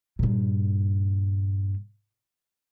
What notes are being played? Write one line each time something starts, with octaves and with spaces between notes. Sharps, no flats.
G2 A#2